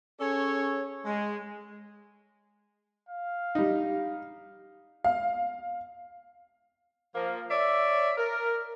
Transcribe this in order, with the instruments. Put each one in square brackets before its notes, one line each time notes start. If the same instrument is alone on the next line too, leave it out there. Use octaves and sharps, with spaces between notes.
[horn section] C#4 G#4 A4 C#5
G#3
[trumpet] F5
[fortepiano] G3 D#4
[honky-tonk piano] F5
[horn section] F3 A#3
C#5 D5 E5
A#4